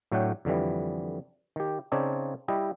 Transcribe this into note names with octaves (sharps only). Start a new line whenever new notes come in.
A2 F#3 A3 D4 F#5 G5
F2 D3 E3 G3
D#3 G4
C#3 C4 D#4 C#5 D5 A5
G3 E4 G4 D#5